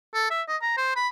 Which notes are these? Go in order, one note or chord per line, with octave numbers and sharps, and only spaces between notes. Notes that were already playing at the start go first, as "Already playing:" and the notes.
A4
E5
D#5
A#5
C5
B5